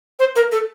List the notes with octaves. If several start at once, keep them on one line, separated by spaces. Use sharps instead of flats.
C5
A#4
A4